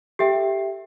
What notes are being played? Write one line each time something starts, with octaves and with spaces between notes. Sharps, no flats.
G4 A4 E5 G5